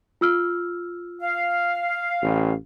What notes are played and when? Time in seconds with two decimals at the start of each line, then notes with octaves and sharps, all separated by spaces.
0.21 F4 E6 F6
1.21 F5
2.22 A1